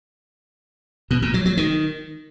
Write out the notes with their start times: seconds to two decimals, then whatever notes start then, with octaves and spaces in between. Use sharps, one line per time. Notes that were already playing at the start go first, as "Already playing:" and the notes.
1.11 B2
1.22 A#2
1.34 F#3
1.46 F#3
1.57 D#3